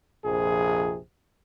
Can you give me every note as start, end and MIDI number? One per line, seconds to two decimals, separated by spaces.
0.24 0.98 34
0.24 0.98 41
0.24 0.98 48
0.24 0.98 68